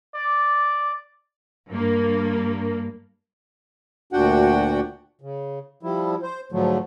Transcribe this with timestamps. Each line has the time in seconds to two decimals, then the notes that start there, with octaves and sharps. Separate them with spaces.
0.15 D5
1.71 G2 A#3
4.13 D2 A#2 D4 F#4 F#5 G5
5.21 C#3
5.83 F3 G3 E4
6.23 C5
6.52 G#2 D3 F3 F#3 A3